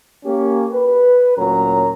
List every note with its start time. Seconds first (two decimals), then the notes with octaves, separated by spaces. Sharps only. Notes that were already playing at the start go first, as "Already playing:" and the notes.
0.25 A#3 C#4 G4
0.73 B4
1.37 D2 A#2 F#3 C#4 A#4 A#5